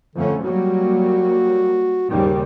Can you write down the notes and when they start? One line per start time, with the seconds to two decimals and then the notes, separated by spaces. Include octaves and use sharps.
0.15 F2 D3 A3 C#4
0.44 F#3 G3 A#3 F#4
2.10 D#2 G#2 C#3 G3